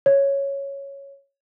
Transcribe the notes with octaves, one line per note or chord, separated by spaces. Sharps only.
C#5